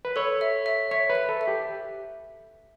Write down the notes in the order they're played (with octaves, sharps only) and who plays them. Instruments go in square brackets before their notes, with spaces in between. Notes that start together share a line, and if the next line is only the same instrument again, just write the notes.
[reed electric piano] B4
[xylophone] A4 [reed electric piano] C#5
[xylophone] E5
E5
[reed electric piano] C#5 [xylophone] E5
[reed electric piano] B4
[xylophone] E5
[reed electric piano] A4
[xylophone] E5
[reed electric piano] G4